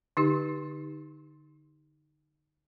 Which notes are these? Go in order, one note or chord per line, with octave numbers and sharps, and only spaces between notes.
D3 D#4 G4